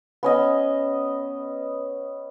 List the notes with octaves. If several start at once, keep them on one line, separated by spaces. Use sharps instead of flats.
B3 C#4 D#5